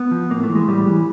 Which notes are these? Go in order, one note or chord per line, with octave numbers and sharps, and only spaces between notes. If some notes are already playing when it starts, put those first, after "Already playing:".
Already playing: B3
F3
A2 A#3
A3
E3
G#3
A2 G3
E3